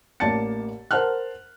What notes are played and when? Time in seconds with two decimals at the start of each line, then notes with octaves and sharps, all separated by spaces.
0.20 A1 A#3 D5 A5 A6 C#7
0.91 A#4 C5 F#5 A5 F6 F#6